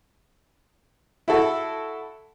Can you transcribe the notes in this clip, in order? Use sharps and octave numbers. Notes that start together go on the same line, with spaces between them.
E4 F#4 A4